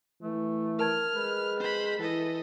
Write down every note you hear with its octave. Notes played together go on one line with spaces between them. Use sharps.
E3 A3
A#4 A5 F6 G#6
G#3 B4
C5 B5
E3 A4 D#5